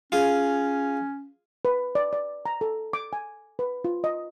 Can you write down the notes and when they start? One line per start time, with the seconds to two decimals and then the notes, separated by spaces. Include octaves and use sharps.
0.12 C#4 F4 G#4
1.65 B4
1.95 D5
2.13 D5
2.46 A#5
2.61 A4
2.93 D6
3.13 G#5
3.59 B4
3.85 F4
4.04 D#5